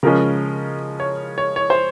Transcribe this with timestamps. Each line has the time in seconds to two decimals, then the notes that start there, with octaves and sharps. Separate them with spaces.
0.03 C#3 F3 G#3 C#4 A#4
1.00 C#5
1.38 C#5
1.56 C#5
1.70 C5